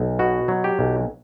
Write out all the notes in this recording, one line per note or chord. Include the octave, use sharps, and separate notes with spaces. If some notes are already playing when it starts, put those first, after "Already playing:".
Already playing: B1
B2 F#4
F#3
G4
B1